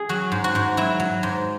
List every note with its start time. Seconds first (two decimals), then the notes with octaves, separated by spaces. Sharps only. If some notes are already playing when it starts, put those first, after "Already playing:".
Already playing: G#4
0.09 F#3 F#4
0.32 G#2
0.44 F#4
0.55 G#2
0.77 F#3 E4
1.00 F#3
1.23 G#2